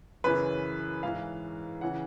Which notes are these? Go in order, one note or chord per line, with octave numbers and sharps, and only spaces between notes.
F#2 C#3 E3 B4
G#2 E3 F5
C#3 E3 F#5